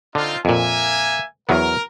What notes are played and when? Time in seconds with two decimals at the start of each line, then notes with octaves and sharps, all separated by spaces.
0.15 D3 C4 D#4 F4
0.45 F2 A#2 A#3 E5 G#5
1.49 E2 F#3 B3 A#4